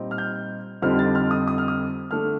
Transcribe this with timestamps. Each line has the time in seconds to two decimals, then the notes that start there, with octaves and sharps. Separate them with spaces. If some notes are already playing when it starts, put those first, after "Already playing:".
Already playing: A#2 G3 C4 D#4
0.11 F6
0.18 G6
0.82 F2 D3 G3 C4 D#4 F6
0.99 A6
1.15 F6
1.31 D#6
1.48 D#6
1.58 F6
1.68 D#6
2.11 D3 A3 D4 F6